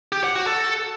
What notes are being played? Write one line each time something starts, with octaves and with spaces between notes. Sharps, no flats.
G4
F#5
F#4
A4